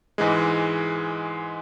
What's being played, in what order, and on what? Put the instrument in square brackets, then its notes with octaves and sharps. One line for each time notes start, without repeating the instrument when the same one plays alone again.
[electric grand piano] G#2 E3 G#3